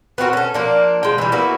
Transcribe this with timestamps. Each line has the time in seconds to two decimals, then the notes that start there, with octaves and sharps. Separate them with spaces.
0.18 B3 C4 F#4 A#4
0.33 C#4 A4
0.54 F3 A#3 D4
1.03 G#3 G5
1.18 E3 G3
1.32 A#3 B3 E4 F#4